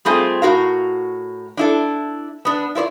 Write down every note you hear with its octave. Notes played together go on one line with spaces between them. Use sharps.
G3 A3 C4 F4 G#4
A2 F#4 A#4 F5
D4 E4 A4
B3 D4
E4 F4 C5 D5